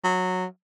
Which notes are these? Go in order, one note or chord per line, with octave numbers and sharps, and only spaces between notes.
F#3